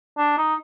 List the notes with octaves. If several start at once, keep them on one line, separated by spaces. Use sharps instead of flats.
D4
D#4